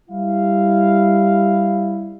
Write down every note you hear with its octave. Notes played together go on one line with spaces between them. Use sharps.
G3 E4 F5